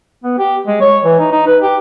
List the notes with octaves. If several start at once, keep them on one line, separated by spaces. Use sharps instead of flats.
B3
G4
G#3
C#5
E3
D#4
D#4
B4
G4